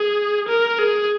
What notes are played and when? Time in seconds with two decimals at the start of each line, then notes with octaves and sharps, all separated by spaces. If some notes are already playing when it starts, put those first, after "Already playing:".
Already playing: G#4
0.49 A#4
0.79 G#4